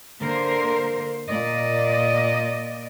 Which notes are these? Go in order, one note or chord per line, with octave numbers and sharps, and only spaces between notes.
D3 A#3 A#4 C5
A#2 D5 D#5